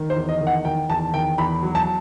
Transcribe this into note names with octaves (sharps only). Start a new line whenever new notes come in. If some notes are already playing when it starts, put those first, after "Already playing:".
Already playing: D#3
C5
E2
D#5
D#3
F#5
D#3 G5
E2 A5
D#3 G5
E2 B5
F#3
A5